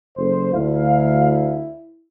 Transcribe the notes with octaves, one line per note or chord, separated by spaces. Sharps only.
F#1 A4 C5
D2 E4 F5